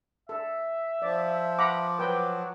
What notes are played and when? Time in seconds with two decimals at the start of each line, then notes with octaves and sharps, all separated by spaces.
0.29 A4 E5
1.02 F3 D5
1.59 F#5 A#5 B5 D6
1.99 F#3 B4 G5